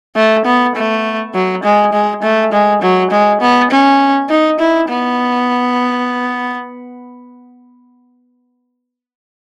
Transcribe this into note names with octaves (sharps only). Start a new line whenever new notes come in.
A3
B3
A3
F#3
G#3
G#3
A3
G#3
F#3
G#3
B3
C#4
D#4
E4
B3